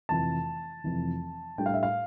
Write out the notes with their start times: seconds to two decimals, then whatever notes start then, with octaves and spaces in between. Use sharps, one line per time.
0.09 F1 F2 E3 A5
0.84 F1 F2 E3
1.58 A2 G3 D4 G5
1.66 F5
1.74 E5
1.83 F5